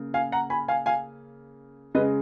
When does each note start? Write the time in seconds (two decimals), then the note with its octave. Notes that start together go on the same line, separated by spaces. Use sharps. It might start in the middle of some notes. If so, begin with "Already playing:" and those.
Already playing: C#3 A#3
0.14 F5 G#5
0.32 F#5 A#5
0.50 G#5 B5
0.68 F5 G#5
0.86 F5 G#5
1.94 C#3 G#3 B4 D#5